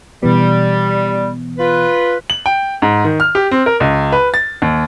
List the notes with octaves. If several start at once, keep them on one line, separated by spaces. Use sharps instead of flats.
B2 E3 G3 B3
F4 B4
F#7
G5
G#2
D#3
F6
G4
C4
A#4
C#2
B4
A6
D#2